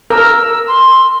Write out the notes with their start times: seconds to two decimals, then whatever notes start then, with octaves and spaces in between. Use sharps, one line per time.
0.10 A#4 E6
0.67 C6